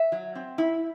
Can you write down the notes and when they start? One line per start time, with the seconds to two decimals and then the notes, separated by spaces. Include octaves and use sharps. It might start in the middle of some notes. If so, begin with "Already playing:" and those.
Already playing: E5
0.12 F#3
0.35 C4
0.58 E4